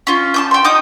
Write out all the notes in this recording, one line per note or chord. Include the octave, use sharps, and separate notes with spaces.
C#4 F4
A5 D6 G6
G5 C6
D#4 D6 D#6 G6